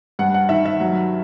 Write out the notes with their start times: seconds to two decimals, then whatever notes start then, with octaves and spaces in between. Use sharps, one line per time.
0.19 G2 F#5
0.34 F#5
0.49 D#3 E5
0.66 E5
0.80 F#3